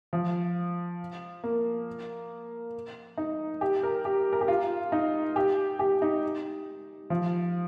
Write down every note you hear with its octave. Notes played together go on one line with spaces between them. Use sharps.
F3
A#3
D#4
G4
A#4
G4
A#4
G4
F4
D#4
G4
G4
D#4
F3